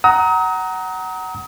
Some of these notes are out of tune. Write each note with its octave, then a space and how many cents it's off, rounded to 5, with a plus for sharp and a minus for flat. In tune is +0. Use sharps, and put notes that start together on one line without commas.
F#5 +20 A#5 +0 D#6 +35